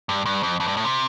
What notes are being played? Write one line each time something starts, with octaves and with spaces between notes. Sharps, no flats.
G2
G2
F2
F2
G2
A2
C3